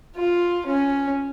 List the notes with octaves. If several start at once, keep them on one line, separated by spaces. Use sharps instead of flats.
F4
C#4